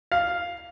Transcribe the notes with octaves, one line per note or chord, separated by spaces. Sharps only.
F5